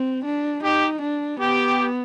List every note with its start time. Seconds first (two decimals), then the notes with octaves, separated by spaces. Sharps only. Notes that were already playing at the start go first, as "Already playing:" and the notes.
Already playing: C4
0.25 D4
0.63 D#4 G4
1.02 D4
1.40 B3 G4